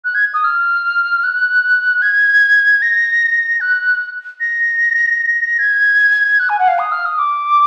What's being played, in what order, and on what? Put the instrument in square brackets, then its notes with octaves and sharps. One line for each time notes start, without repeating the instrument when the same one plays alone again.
[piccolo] F#6
G#6
D#6
F6
F#6
G#6
A#6
F#6
A#6
G#6
F#6
G#5
F#5
F5
D#6
F6
D#6
D6